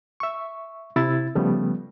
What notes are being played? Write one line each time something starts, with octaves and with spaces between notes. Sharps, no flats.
E5 C#6
C3 E4 A6
C#3 F3 G3 A3 B3